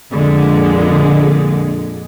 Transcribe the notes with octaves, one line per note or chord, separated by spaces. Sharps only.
F2 A#2 D3 G#3